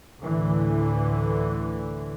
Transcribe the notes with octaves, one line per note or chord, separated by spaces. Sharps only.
D2 A2 D3 E3